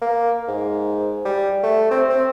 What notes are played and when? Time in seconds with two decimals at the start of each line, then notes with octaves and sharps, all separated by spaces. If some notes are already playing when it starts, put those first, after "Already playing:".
0.01 A#3
0.48 G#2
1.25 G3
1.63 A3
1.91 C4
2.09 C4